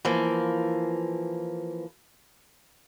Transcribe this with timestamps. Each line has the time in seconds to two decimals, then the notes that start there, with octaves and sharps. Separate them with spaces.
0.05 E3 F3 A#3